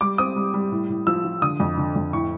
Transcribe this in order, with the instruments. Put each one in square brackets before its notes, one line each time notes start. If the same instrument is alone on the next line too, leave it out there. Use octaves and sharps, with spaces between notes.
[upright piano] G3 D6
C4 D#6
G3
G3
A2
A2
F3 E6
F3
D3 D#6
F2
D3
F2
A2 C#6